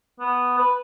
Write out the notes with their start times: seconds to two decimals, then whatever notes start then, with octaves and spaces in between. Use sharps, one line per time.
0.20 B3
0.58 B4